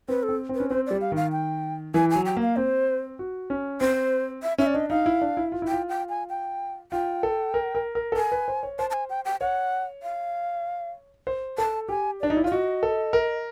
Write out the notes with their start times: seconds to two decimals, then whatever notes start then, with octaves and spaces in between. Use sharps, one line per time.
0.08 C4 B4
0.23 A4
0.29 C4
0.49 C4
0.55 B4
0.60 C#4
0.70 C4 C5
0.86 G3 D5
1.01 F5
1.12 D#3 F5
1.32 G5
1.94 E3 G#5
2.10 G#5
2.15 F#3
2.25 G5
2.37 A#3
2.42 F5
2.56 C4 C5
3.19 F#4
3.50 C#4
3.81 C4 C5
4.43 E5
4.58 C#4 E5
4.67 D5
4.75 D4 D#5
4.90 D#4 F5
5.06 E4
5.22 D4
5.37 E4
5.52 F4
5.62 E4
5.68 F4 G5
5.89 G5
6.09 G#5
6.30 G5
6.92 F4 G5
7.23 A4
7.54 A#4
7.75 A#4
7.95 A#4
8.12 A4
8.16 A#4 G#5
8.32 B4
8.48 C5
8.63 C#5
8.79 C5 A5
8.90 A5
8.93 G#5
9.10 G5
9.25 G5
9.41 C#5 F#5
10.03 F5
11.27 C5
11.58 A4 A5
11.89 G4 G#5
12.21 D4 D5
12.30 D#4
12.37 E4
12.44 F4 D5
12.51 F#4 D#5
12.83 A4
13.13 A#4